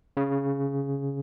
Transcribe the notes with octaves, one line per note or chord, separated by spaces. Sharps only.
C#3